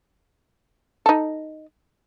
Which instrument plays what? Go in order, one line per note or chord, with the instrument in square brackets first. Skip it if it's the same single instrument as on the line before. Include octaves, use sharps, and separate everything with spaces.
[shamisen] D#4 A4